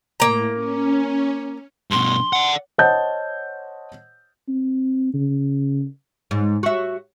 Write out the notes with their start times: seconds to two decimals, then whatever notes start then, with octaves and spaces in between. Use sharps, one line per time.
0.20 A2 A#3 A#5
0.55 C#4
1.91 G2 B2 C6
2.33 D5 F#5
2.78 C5 C#5 D#5 F#5 A5 G6
4.48 C4
5.14 C#3
6.31 G#2
6.63 F#4 E5